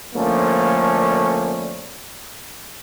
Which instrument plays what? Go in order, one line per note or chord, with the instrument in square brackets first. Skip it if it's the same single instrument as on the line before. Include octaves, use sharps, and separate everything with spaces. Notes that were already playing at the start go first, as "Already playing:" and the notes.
[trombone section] D3 F3 A3 A#3 C#4 D4